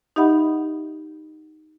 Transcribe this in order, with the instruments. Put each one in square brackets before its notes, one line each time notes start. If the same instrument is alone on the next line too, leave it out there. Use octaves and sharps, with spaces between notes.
[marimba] D#4 G4 D#5 E5 F#5 B5